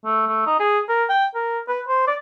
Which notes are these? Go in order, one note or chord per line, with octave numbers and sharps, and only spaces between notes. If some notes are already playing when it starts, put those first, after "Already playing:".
A3
A3
D#4
G#4
A#4
G5
A#4
B4
C5
D5